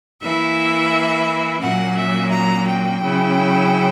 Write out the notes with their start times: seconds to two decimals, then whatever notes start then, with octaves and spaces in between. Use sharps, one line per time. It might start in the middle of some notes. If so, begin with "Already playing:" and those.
0.21 E3 A#3 E4 E5
1.61 A#2 F#3 A#3 C#4 F#5
1.96 E5
2.31 A#5
2.67 G5
3.02 C#3 F#3 C#4 E4